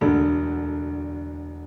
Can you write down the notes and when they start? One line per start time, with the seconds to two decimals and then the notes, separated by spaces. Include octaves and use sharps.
0.01 E1 D2 D3 A3 D4